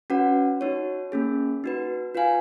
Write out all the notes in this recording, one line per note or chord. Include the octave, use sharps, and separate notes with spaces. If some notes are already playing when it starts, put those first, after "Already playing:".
C#4 F#4 B4 F#5
D#4 F#4 C#5
A#3 C#4 G#4
D#4 F#4 B4
F4 B4 F5 G#5